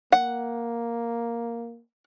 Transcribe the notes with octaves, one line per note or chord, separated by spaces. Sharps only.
A#3 F#5